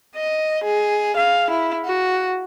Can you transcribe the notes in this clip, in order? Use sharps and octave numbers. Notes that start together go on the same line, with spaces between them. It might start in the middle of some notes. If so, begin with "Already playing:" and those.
D#5
G#4
F5
E4
F#4